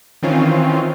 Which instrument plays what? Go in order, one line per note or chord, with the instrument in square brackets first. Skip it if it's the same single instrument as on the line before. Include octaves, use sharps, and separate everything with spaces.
[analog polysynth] D#3 E3 C4 C#4 F4